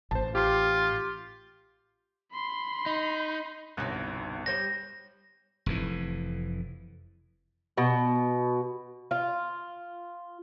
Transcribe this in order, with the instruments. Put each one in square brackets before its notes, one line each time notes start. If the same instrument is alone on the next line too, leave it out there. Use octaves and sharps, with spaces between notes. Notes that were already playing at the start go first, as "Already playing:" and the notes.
[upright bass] A1 [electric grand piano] C5 A5
[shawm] F4 [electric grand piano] G4 C6
[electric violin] B5 C6
[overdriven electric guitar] D#4
[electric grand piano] G1 C2 F#6 [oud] B2 C#4 D#4
[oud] G3 C5 C#5 [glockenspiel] A#6
[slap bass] F1 F2 E3
[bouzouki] B2
F4